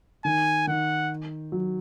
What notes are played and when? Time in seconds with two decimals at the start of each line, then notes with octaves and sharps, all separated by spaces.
0.25 D#3 G#5
0.67 D#3 F#5
1.52 F#3